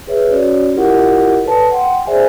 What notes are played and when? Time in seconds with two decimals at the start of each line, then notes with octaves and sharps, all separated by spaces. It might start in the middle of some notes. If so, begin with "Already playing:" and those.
0.07 G#4 B4 C#5 E5
0.31 C#4 F#4 C#5 D5
0.75 E4 F4 G4 A#4 D#5 F#5
1.44 A4 B4 C#5 D5 A5
1.71 F#5 G5 C6
2.07 G#4 C5 D5 E5 G#5